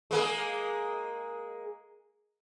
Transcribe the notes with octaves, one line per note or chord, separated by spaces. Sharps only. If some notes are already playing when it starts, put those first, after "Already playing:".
G#3 A#3 G#4